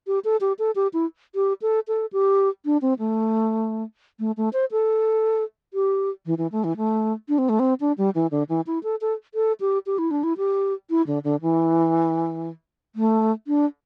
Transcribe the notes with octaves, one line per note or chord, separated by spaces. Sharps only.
G4
A4
G4
A4
G4
E4
G4
A4
A4
G4
D4
C4
A3
A3
A3
C5
A4
G4
E3
E3
A3
E3
A3
D4
C4
A3
C4
D4
G3
E3
D3
E3
E4
A4
A4
A4
G4
G4
E4
D4
E4
G4
E4
D3
D3
E3
A3
D4